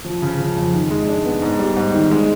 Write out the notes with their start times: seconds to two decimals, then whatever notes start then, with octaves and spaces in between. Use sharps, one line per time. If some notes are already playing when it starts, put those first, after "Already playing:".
0.05 F3
0.22 C#3
0.39 F3
0.56 F2
0.73 D#3
0.91 G#3
1.07 D4
1.25 B3
1.42 G#2
1.59 G3
1.76 G#2
1.94 D#3
2.11 G#3